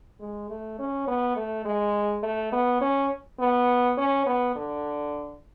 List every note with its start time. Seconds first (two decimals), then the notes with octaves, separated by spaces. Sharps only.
0.20 G#3
0.50 A3
0.79 C#4
1.07 B3
1.36 A3
1.65 G#3
2.23 A3
2.52 B3
2.81 C#4
3.40 B3
3.98 C#4
4.26 B3
4.55 D3